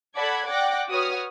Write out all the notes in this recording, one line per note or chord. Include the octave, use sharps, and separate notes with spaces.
A4 D5 F#5 B5 G#6
D5 F#5 G5 D6 F#6 A#6
F#4 B4 C#5 D#6 F6